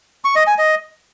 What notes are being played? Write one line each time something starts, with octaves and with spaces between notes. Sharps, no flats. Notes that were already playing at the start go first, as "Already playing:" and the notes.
C#6
D#5
G#5
D#5